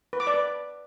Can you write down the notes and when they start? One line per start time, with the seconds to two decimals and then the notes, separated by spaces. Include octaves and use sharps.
0.13 B4
0.20 D6
0.27 D5
0.34 B4